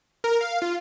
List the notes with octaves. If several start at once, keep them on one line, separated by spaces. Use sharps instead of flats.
A#4
F5
F4